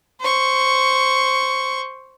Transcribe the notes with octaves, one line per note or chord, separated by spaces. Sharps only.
C5 C#6